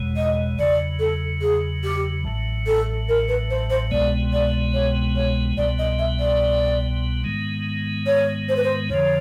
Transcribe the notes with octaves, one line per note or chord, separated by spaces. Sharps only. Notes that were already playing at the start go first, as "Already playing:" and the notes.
Already playing: F#1 E2 B2 G#3
D#5
E2 C#3 F#3 D5
A4
G#4
G4
A1 A2 F#3
A4
A#4
B4
C5
C5
C2 B2 G#3 B3 D5
D5
C#5
C#5
C2 B2 G3 B3 D5
D#5
E5
D5
G#2 D#3 G#3 B3
C#5
C5
B4
C5
F2 D3 F3 C#5